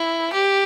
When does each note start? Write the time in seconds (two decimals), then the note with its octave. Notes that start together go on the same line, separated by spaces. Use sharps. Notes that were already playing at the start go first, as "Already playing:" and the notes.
Already playing: E4
0.33 G4